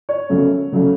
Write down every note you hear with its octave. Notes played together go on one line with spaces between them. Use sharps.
C#5
F#2 C#3 F#3 A3 C#4
C#3 F#3 A3 C#4